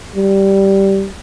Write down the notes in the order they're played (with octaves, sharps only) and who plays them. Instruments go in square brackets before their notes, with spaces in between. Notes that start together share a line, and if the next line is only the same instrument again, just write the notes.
[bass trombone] G3